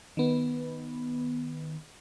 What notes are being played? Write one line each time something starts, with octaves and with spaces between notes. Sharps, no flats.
D#3 B3